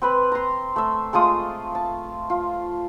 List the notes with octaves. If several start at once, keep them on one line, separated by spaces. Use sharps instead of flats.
C4 B4 B5
A#5 C6
A3 E5
G#3 A3 F4 D#6
A5
F4